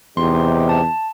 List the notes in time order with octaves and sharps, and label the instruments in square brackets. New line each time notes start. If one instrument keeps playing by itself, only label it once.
[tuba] E2 [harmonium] C3 D#4 G4 [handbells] C6
[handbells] A5